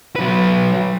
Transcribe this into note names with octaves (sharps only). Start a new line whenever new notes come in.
F#3 B4